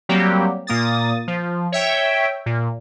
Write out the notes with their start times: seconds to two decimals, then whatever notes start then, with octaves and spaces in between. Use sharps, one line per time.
0.09 F#3 G3 A#3 C4 G4
0.67 A#2 A#3 D#6 A6
1.28 F3
1.72 C#5 E5 G5
2.46 A#2